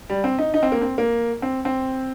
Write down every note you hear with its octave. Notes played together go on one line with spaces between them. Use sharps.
G3
C4
D#4
D#4
C4
A#3
C4
A#3
C4
C4